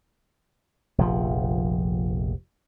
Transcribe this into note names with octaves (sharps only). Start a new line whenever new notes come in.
F1 A#1 F3